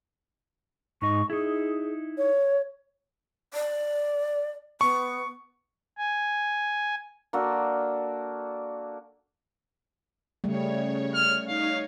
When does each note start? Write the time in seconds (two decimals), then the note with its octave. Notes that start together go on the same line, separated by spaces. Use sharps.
1.02 G#2 D#4 D#5 C#6
1.30 D#4 E4 G#4
2.18 C#5
3.54 D5
4.81 B3 C#6
5.98 G#5
7.33 A#3 D4 F#4 A4
10.44 C#3 G3 A3 C#5
11.14 F6
11.48 D#4 C#5 F5